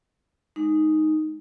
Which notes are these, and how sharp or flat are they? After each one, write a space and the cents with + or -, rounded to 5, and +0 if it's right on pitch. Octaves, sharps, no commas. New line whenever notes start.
G#3 +0 D#4 +0